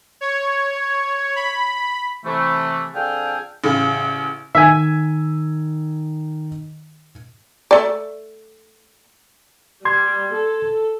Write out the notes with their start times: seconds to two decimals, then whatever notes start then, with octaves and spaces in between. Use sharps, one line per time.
0.21 C#5
1.36 B5
2.25 C3 E3 A3
2.95 F2 D3 G#4 A4 F5 G5
3.64 A1 C#3
4.55 D#3 E5 G#5
7.71 A3 D5
9.85 G3 C6 G#6
10.35 A4